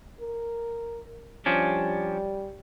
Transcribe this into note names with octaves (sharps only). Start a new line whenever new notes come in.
A#4
F3 G3 C#4 D4